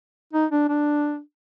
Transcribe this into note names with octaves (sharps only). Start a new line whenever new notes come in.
D#4
D4
D4